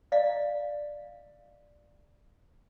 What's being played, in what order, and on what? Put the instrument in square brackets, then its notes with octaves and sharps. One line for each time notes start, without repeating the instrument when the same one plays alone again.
[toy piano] D5 D#5 F5